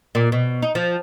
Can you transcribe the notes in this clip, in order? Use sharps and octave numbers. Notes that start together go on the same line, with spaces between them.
A#2
B2
D#4
F3